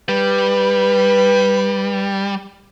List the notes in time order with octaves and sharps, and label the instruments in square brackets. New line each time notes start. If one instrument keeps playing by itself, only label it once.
[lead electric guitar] G3 [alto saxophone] B4